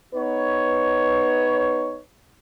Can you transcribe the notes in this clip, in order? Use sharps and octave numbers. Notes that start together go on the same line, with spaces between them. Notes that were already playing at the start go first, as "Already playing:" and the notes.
B3 D#4 B4 C#5